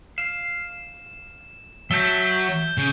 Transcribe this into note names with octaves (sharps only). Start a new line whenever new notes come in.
F5 E7
F#3 E5 A5 G6 E7 G7
C#3 G6